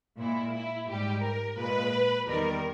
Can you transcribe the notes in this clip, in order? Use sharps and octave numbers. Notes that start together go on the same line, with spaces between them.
A#2 G#3 E4
E4
G#2 G3 G4
A#4
A#2 G#3 B4
E2 D#3 G3 A#4